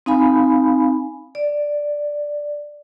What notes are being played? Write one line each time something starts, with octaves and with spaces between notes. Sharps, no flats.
C4 D#4 F5 G#5 B5
D5